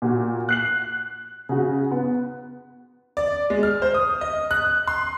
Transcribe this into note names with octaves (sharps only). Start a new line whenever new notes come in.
A#2 F#4
F#6 C7 F#7
C#3 F#4
B3
D5
G#3
F6
C5
D#6
D#5
F#6
C6